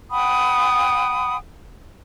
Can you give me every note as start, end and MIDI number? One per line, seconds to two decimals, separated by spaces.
0.11 1.36 78
0.11 1.36 79
0.11 1.36 83
0.11 1.36 87